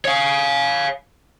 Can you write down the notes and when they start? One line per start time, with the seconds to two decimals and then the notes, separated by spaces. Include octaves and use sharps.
0.05 C#5 F5